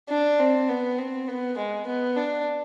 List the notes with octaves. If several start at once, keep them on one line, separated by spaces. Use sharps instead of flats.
D4
C4
B3
C4
B3
G#3
B3
D4